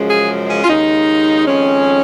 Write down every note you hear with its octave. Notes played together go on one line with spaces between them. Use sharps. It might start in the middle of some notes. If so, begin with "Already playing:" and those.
Already playing: F#2 C#3 F3 G#3
G#4
C#4
F4
D#2 C#3 G#3 D#4
F2 D#3 G#3 C#4